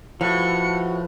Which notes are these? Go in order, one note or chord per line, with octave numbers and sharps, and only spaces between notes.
A2 F3 F#4 B4 C#7